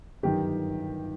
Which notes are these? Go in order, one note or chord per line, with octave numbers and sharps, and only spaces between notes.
G1 F#2 D#3 G4